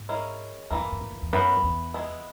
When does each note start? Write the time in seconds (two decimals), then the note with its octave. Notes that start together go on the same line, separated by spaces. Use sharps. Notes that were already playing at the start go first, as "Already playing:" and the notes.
Already playing: G#2
0.09 G#3 C#4 E4 A#4
0.71 E2 E3 A#3 E4 A#4
0.80 F#2
0.92 F#2
1.01 G#2
1.12 E2
1.22 E2
1.33 F#2 E3 B3 E4 B4
1.63 E2
1.94 G#3 B3 E4